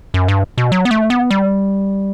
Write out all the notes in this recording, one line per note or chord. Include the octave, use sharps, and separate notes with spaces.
F#2
G2
B2
F#3
B3
A3
B3
G3